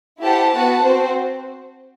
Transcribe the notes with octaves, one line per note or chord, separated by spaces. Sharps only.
E4 G4 C5 F#5 A5
B3 F#4 B4 F#5 A5
C4 F#4 C5